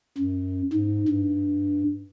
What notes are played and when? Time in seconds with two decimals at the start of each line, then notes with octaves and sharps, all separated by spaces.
0.18 F#2
0.73 G#2
1.09 G2